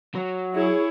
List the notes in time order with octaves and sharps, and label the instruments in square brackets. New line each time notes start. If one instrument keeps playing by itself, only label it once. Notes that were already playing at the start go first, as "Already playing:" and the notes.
[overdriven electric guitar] F#3
[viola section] E4 G#4 C#5